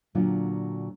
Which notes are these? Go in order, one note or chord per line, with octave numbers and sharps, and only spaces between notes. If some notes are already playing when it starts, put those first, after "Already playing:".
A#2 D3 F#3 D4 F4